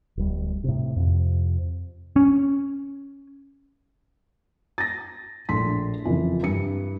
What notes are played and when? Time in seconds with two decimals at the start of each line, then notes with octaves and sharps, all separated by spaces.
0.17 D1 G3
0.64 A2 C3
0.96 F2 C3
2.16 C#4
4.78 A6 A#6
5.49 A#1 A2 C6 B6
6.04 F#1 F2 E3 F3
6.43 G2 C#7